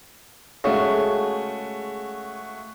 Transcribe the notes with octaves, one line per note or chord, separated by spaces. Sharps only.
C#3 G#3 A3 F#4